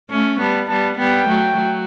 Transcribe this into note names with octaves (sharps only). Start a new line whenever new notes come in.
A3 C#4
G3 B3 A5
G3 B3 A5
G3 B3 G5
F#3 A3
F#3